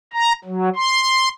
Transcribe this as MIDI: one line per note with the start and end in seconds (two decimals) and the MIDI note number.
0.13 0.33 82
0.44 0.69 54
0.76 1.29 84